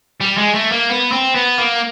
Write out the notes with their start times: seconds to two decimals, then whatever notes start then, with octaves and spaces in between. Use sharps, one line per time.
0.21 G3
0.38 G#3
0.55 A3
0.72 A#3
0.89 B3
1.12 C4
1.35 B3
1.58 A#3